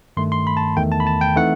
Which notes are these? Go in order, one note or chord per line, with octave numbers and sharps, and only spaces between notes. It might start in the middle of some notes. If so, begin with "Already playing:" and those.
G2 D#3 A3 C6
C6
B5
A5
E2 D#3 A3 G5
A5
B5
A5
G5
E3 A3 C4 D#4 F#5